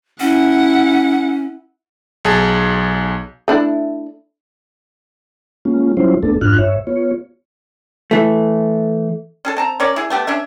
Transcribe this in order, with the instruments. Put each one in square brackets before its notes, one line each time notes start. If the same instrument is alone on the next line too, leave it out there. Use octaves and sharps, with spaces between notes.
[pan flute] C#4 [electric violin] E4 F#5
[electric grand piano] B1 G#4 A5
[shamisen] A3 D4 E4
[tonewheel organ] G#3 A#3 C#4 F4
F#3 G3 C#4 E4 F4 C5
E2 A3 B3 D4 A4
F2 G#2 D4 F4 F6 F#6
G2 C#5 E5
B3 F4 C#5
[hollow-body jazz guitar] E3 A3
[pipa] C#4 G#4 A4
C4 A5 A#5
C#4 A#4 C#5 D5
E4 G#4
A3 B3 G4
C#4 D4 E5